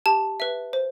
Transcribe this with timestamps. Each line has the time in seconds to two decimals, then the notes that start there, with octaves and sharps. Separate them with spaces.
0.06 G4 A5
0.40 B4 E5
0.73 C5